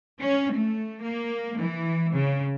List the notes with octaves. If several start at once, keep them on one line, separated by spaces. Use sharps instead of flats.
C#4
A3
A#3
E3
C#3